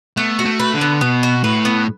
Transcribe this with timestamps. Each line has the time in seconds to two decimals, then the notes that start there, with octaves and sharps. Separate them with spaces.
0.17 A3 B3
0.39 F#4
0.46 A3
0.60 B4
0.74 D3
0.81 B3
1.01 B2 B3
1.23 F#4
1.44 A2 B4
1.65 B3